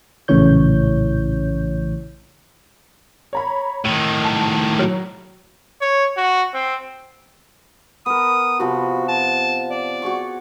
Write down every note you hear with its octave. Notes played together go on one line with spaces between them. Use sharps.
A#1 A2 C#3 E3 C#5 G6
C#5 A#5 B5
A2 D#3 D#7
A5
F#3
C#5
F#4
C4
B3 A#4 D#6
C3 F3 B3 F#4
A5
D5
F#4 G#4 C#6